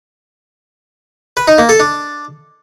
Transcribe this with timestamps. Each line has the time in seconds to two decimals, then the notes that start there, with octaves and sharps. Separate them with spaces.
1.37 B4
1.48 D#4
1.58 A#3
1.69 A4
1.80 D4